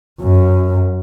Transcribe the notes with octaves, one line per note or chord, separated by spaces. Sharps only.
F#2